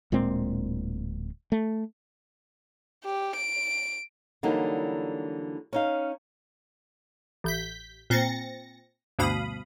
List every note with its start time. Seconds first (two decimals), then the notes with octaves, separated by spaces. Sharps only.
0.12 D1 A#2 G#3 C4
1.52 A3
3.04 G4
3.36 D7
4.43 D3 E3 F#3 G3 A#3 D#4
5.73 C#4 D#4 F5
7.44 A1 G6 B6
8.10 A#2 C4 A6 A#6 C#7
9.19 D2 G2 B2 F5 B5 D#6